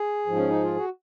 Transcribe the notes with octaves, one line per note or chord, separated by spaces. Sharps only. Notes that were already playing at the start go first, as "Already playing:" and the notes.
Already playing: G#4
G#2 F3
C#4
D#4
F4
F#4